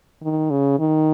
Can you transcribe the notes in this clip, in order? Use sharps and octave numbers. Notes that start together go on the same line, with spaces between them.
D#3
C#3
D#3